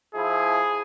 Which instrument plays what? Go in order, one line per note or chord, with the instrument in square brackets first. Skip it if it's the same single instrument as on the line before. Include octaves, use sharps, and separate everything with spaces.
[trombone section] F3 E4 [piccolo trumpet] G#4